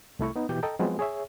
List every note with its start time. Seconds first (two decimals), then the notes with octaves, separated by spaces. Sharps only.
0.19 C2 A3 E4 C#6
0.36 B3 D#4
0.49 B2 E3 G4 G6
0.63 A4 D#5 G5 A#5
0.79 F3 F#3 G#3 B3 C4 C5
0.99 G#4 C#5 E5